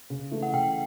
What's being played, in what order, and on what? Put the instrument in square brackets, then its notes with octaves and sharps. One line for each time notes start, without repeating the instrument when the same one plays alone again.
[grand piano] C#3
E3 A3
[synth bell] F#5
[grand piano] C#3 [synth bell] G5